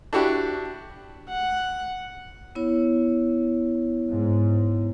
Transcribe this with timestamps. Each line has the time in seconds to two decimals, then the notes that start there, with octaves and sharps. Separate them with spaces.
0.13 D4 E4 F#4 G4
1.30 F#5
2.55 B3 E4 C#5
4.09 G#2